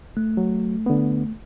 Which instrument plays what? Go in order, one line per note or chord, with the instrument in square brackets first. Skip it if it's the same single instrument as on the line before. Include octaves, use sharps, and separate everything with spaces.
[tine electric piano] A3
[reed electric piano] F#3
D3 B3